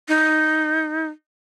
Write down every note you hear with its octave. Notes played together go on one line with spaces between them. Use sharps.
D#4